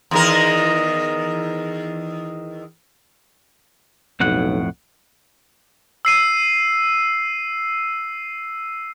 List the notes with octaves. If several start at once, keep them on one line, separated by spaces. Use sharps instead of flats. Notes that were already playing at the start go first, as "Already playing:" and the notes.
E2 D#3 A#4
B1 F2 A2 F#5
E6 C7 D#7